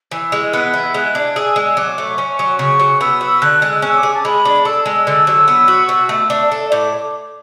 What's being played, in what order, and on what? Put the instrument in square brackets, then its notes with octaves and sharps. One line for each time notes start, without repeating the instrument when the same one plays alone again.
[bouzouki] E3 [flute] E6
[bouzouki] G#3
[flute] E6
[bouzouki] B3 [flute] F#6
[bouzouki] E4
[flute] E6
[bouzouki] G#3 [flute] F#6
[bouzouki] D4
[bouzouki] G#4 [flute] E6
[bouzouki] G#3
[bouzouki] F#3 [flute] D6
[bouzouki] A3
[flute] C#6
[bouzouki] C#4
[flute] C#6
[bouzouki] F#3
[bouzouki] C#3 [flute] C#6
[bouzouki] F#3
[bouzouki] B3 [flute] E6
[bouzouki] F#4
[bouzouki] D3 [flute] F#6
[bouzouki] G#3
[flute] E6
[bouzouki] C#4
[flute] D6
[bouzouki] G#4
[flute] A5
[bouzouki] G#3 [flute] B5
[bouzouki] D4
[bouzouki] A4 [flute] E6
[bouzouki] G#3
D3
F#3
B3
F#4
B2
A3
D4
A4
[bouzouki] A2 [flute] D6